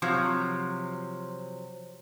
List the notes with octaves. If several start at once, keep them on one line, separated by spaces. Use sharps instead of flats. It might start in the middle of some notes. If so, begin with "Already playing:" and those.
C3 F3 F#3